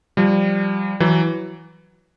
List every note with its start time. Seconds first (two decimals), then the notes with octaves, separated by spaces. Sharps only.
0.17 F3 G3
1.00 E3 F#3